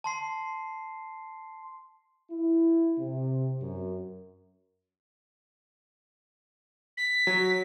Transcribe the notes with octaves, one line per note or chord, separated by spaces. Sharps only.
A5 C6 C7
E4
C3
F#2
B6
F#3